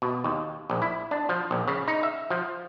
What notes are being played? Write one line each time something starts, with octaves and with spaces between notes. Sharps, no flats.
B2
D#2
A#1
E4
D4
F3
A#1
C#3
D#4
E5
F3